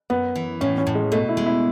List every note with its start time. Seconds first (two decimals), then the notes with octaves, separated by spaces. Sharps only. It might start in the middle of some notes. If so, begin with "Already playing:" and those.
0.10 F#2 B3
0.36 E3
0.61 A2 C#4
0.78 C#4
0.87 A2
0.95 G#3
1.12 B2 A3
1.29 E4
1.37 G#3
1.46 E4